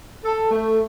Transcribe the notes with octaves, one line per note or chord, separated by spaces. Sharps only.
A4
A3